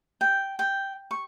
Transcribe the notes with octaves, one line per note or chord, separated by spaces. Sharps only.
G5
G5
C#6